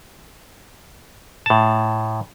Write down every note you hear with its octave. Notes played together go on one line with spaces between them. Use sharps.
A2 A5